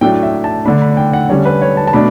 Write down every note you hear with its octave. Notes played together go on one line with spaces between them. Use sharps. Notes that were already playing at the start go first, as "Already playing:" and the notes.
A2 F#3 A3 D4 G5
E5
A5
D3 A3 D4 B5
B5
G5
F#5
D3 G3 C#4 C#5
B4
C#5
A5
A5
B2 A3 D4 B5